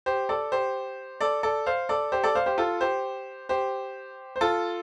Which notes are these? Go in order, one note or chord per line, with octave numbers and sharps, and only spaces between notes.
G4 C5
A4 D5
G4 C5
A4 D5
A4 D5
C5 F5
A4 D5
G4 C5
A4 D5
C5 F5
G4 C5
F4 A4
G4 C5
G4 C5
C5
F4 A4